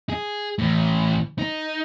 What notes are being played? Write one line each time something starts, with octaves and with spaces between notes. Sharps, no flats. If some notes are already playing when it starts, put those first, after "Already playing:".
G#4
A2 E3
D#4